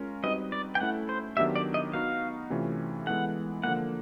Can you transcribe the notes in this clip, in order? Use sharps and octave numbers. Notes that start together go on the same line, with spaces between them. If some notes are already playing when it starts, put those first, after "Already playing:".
Already playing: G#3 C#4 F4 A#4
G3 C4 D#4 F#4 B4 D#5
D5
G5
A3 C#4 E4 A4 F#5
C5
D#3 F#3 B3 D4 G4 E5
D5
D#5
B3 D#4 F#4 F5
C3 E3 A3 C#4 F4
E3 G#3 B3 E4 A4 F#5
D3 F3 A#3 F#5